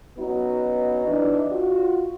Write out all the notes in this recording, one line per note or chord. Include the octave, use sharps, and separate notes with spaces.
F#3 B3 C#4 D#4 F#4
E3 D4 D#4
F4 F#4